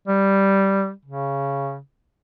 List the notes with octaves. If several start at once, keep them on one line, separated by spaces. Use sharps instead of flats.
G3
C#3